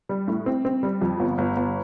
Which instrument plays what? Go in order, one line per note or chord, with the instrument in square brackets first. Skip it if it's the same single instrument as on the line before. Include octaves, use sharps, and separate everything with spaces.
[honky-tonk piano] G3
A2
C4
C4
G3
F2
G1
G1
G1